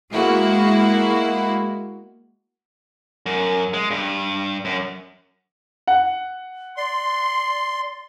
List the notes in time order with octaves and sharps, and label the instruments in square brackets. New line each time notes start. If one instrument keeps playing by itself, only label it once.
[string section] G#3 A#3 E4 F#4
[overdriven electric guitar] F#2
G#3
G2
F#2
[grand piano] F#5
[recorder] D5 [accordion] C6